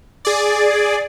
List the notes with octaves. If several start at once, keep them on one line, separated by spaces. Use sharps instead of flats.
G#4 D5